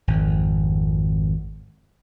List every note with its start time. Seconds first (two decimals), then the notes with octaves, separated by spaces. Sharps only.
0.08 G#1 F2